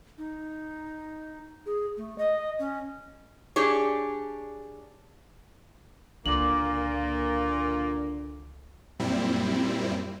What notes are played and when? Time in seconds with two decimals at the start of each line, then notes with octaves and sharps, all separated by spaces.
0.18 D#4
1.66 G#4
1.97 A3
2.18 D#5
2.59 C#4
3.56 D4 G4 G#4 C#5
6.26 C#2 A#2 D3 A#3 D6 F#7
8.99 F#2 A#2 G3 C4 E4